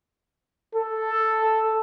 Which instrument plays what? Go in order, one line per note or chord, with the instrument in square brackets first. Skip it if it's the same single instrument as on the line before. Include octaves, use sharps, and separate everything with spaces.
[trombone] A4